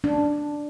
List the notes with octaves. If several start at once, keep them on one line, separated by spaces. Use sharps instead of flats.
D4